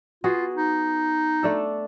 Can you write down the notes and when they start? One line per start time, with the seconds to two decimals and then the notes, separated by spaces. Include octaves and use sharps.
0.24 B3 F4 F#4 G#4
0.55 D#4
1.43 A3 D4 A4